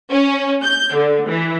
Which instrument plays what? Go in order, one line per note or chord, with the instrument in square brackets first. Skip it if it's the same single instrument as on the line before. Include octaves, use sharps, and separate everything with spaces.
[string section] C#4
G6
D3
E3